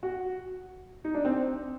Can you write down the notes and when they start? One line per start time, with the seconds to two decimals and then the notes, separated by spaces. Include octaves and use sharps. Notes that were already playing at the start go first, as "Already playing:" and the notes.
0.03 F#4
1.04 D#4
1.14 D4
1.25 C4